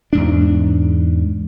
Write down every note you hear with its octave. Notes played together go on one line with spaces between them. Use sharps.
E2 G#2 D4